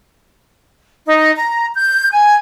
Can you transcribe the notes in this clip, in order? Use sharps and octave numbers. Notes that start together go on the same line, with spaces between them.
D#4
A#5
G6
G#5